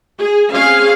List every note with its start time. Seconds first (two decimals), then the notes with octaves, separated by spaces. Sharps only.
0.19 G#4
0.51 C4 C#4 G#4 F5